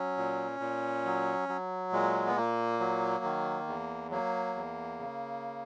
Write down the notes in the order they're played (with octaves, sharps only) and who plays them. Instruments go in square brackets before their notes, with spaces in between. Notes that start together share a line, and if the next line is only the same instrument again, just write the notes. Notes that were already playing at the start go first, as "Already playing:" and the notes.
Already playing: [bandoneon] F#3 C#4
A#2
A#2
F#3
F#3
A#2 G#3
B3
A#2 A#3
F#3
D#3
E2
F#3 A#3
E2
C#3